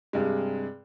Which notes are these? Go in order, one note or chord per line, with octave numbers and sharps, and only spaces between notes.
G2 C3 G#3